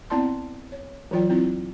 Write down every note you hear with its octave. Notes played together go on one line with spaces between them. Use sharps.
B3 C4 E4 D5 A5 C6
C#5
E3 F#3 F4 D5 G5
C4 E4 F4